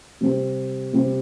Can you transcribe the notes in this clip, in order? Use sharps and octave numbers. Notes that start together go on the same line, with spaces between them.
C3 G3 C4
C3 G3 C4